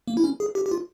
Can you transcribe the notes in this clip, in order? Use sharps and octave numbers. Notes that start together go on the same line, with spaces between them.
A#3
E4
C#4
G#4
G4
G4
F4